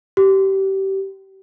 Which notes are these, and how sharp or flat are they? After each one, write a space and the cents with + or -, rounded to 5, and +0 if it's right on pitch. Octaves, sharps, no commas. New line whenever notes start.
G4 -25